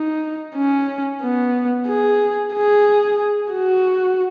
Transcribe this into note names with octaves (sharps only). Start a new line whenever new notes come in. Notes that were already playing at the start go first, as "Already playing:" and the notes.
Already playing: D#4
C#4
B3
G#4
G#4
F#4